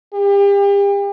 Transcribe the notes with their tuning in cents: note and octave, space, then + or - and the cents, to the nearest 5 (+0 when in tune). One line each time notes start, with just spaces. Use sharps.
G4 +35